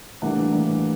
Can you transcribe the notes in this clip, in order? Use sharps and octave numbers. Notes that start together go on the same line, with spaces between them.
A2 E3 G3 A#3 D4 F#5
A2 E3 G3 A#3 D4